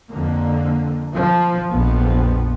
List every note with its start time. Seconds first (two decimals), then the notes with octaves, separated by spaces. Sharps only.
0.12 F2 D3 A#3
1.14 F3
1.69 A#1 F2 F3 B3